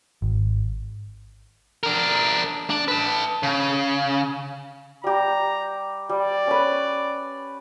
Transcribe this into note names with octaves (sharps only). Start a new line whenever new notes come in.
G#1
D4 A#4
D4
B4 A5
C#3
G3 G4 A#5
G3 D5
C#4 B4